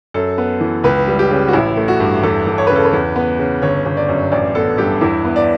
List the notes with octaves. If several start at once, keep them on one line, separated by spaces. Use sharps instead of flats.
F#2 A4
B3
E3
C#2 B4
G3
G4
C#3
F#4
A1 E4
A3
F#4
G2
E2 A4
E2
C#5
C#3 B4
A4
B4
E2
B3
C#3
G1 C#5
G1
D5
F#2
A1 D5
B3 A4
G2 G4
E2 E4
B3
D5